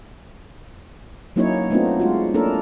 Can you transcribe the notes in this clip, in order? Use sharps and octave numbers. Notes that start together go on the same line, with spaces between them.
F#3 A#3 C#4 D#4 E4 C#5
A3 B3 C4 D4 D#4 F4
G#3 F4 F#4
A#3 C#4 D4 E4 A4 A#4